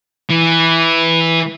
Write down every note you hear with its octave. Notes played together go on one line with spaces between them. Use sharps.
E3